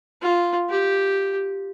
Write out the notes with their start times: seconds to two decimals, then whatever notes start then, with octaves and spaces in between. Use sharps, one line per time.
0.22 F4
0.69 G4